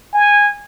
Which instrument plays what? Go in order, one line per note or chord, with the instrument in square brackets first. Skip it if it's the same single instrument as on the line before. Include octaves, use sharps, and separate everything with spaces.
[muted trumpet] G#5